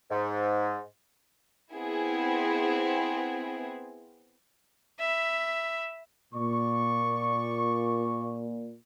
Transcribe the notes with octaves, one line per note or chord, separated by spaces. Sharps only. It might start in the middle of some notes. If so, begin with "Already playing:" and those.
G#2
B3 C4 E4 G#4
E5 B5
A#2 D5 C#6